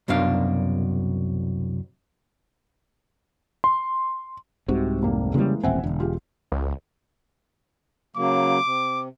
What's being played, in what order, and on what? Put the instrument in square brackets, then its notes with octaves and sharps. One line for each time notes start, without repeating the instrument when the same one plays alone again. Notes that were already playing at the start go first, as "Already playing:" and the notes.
[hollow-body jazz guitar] C2 F#2 B2 D4 F5
[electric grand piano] C6
[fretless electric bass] C2 G#2 C3 [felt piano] F#4
[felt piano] F1 A#3
[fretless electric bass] C#3 G3 [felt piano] E3 G#3 A#3
[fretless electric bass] D#1 A1 C4 [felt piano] E5 F#5 G#5
[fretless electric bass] E1 [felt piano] D3
[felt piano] F4 G4 G#4
[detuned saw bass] C#2
[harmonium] C#3 F#3 A#3 [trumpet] D6
[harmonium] C3